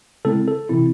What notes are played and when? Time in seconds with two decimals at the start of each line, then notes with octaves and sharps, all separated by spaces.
0.25 C#3 G#3 C4 E4 A4
0.48 A4
0.69 C3 E3 C4 E4